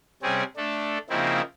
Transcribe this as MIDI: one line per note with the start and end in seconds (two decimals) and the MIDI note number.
0.23 0.43 48
0.23 0.43 55
0.23 0.43 60
0.23 0.43 61
0.23 0.43 68
0.57 0.98 57
0.57 0.98 62
0.57 0.98 69
1.10 1.41 49
1.10 1.41 53
1.10 1.41 58
1.10 1.41 60
1.10 1.41 63
1.10 1.41 64